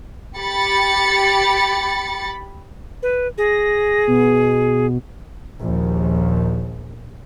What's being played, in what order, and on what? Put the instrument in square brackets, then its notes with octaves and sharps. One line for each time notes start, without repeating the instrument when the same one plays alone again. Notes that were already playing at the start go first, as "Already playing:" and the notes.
[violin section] G4 B5 A6 C#7
[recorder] B4
[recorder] G#4 [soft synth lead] A#6
[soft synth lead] B2
[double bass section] A#1 D#2